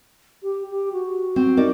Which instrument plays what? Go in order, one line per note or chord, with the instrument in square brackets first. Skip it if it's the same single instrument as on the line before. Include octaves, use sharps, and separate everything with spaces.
[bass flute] G4
G4
F#4
[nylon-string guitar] C4
D#4 A#4 D5